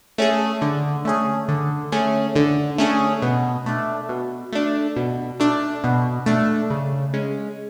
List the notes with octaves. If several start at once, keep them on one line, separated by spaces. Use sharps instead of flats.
A3 C#4 G#4
D3
A3 C#4 G#4
D3
A3 C#4 G#4
D3
A3 C#4 G#4
B2
A3 D4
B2
A3 D4
B2
A3 D4
B2
A3 D4
C#3
G#3 C#4